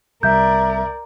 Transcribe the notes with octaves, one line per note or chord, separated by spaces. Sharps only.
C2 A#4 D5 E5 G6